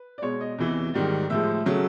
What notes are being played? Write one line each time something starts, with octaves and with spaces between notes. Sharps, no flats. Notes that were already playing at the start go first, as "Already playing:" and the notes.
Already playing: B4
D5
B2 G#3 C#5
D#5
E2 C3 E3
G#2 D#3 G3
A2 F3 G#3 E5
C#3 F#3 A3